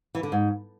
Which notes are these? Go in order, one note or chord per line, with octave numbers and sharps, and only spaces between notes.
E3
D3
G#2